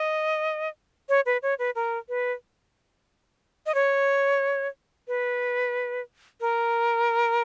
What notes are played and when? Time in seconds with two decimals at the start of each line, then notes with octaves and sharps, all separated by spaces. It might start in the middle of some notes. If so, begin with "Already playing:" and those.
Already playing: D#5
1.09 C#5
1.26 B4
1.43 C#5
1.59 B4
1.75 A#4
2.09 B4
3.66 D#5
3.75 C#5
5.08 B4
6.41 A#4